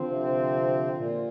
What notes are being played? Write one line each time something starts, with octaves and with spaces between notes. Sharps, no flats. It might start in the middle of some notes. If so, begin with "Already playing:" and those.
Already playing: D3 F3 C4
C3
A#2